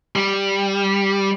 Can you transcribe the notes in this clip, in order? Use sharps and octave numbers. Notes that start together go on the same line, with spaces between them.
G3